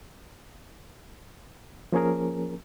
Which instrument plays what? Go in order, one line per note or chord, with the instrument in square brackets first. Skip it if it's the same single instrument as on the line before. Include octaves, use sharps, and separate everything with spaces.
[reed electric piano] F3 A#3 C#4 G#4 A#4